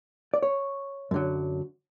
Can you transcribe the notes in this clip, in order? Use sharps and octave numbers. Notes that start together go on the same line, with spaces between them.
D5
C#5
F#2 D3 F#3